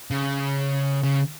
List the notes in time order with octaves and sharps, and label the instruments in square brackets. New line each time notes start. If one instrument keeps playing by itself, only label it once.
[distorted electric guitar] C#3
C#3